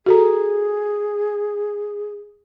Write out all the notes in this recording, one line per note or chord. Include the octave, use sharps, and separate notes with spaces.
F#4 G#4 A4 A#5